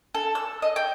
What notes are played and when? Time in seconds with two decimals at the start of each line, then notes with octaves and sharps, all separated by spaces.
0.15 A4
0.35 E6
0.62 D#5
0.76 G5